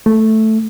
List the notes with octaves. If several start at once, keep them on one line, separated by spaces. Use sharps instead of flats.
A3